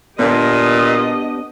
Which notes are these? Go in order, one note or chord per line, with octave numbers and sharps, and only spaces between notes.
A#2 B3 D4 G4 A4 D#5